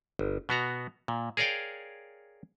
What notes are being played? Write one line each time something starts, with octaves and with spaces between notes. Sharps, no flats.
G1
B2 B3 F#4 A#5
A#2
G#4 A#4 C#5 D5 F5 G5